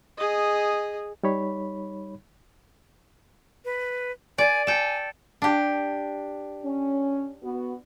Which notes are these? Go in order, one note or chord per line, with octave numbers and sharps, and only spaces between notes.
G#4 D#5
G3 D#4 C#5 B5
B4
D5 G#5
A4 G5 G#5
D4 G4
C#4
B3 F#4